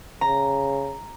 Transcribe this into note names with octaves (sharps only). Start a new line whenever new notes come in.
C#3 A#5